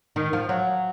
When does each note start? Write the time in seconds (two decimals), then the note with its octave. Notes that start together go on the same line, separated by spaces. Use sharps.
0.16 D#3
0.33 F3
0.49 F#3